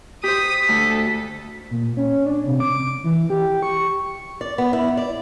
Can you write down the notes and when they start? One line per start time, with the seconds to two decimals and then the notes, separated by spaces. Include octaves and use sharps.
0.24 G4 C5 D#6 B6
0.68 D2 A4
1.71 A#2
1.97 C#4
2.26 D4
2.46 C3
2.60 D6
3.04 E3
3.30 G4
3.63 C#6
4.41 D5
4.58 B3
4.73 E4
4.97 D5